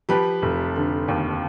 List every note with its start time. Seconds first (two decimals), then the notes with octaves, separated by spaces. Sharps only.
0.09 F3 G4 B4
0.42 F1
0.76 D3
1.08 D#2